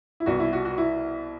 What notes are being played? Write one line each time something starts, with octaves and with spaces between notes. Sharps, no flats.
E4
C2 B2 F#4
E4
F#4
F#4
E4